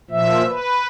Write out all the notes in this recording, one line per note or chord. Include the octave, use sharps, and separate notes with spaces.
A#2 F3 E5
B4